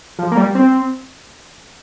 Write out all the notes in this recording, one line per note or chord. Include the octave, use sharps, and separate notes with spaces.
F3
A#3
G3
C4